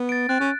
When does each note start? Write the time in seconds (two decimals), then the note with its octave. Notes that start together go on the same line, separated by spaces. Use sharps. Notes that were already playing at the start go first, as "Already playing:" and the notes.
Already playing: B3
0.09 A6 D7
0.29 C4 F#6
0.40 C#4